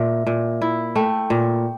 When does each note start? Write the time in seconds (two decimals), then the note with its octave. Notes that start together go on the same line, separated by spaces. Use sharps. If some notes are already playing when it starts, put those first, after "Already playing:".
Already playing: A#2 E5
0.27 A#2
0.62 E4
0.95 A3 G5
1.30 A#2